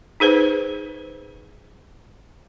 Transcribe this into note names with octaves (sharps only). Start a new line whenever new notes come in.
D#4 G#4 B4 C5